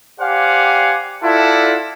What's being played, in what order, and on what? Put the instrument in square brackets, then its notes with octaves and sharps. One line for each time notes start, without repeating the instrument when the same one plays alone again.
[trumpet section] G4 C5 D5 F5 F#5 G#5
E4 F4 A4 D5 F#5 A5